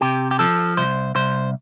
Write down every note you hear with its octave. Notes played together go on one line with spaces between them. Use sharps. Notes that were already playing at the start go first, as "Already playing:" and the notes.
C3 G4
G4
F3 A4
C2 C5
C2 C5